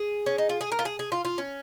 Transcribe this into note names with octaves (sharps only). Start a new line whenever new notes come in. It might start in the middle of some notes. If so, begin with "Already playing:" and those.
Already playing: G#4
C#4
D#4
F4
G#4
A#4
F4
G#4
G#4
F4
F4
C#4